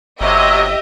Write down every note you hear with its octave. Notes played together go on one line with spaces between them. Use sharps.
G1 C3 F#3 G4 D#5 E5